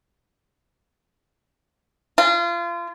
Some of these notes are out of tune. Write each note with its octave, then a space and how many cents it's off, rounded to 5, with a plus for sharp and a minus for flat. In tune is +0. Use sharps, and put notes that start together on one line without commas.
F4 -30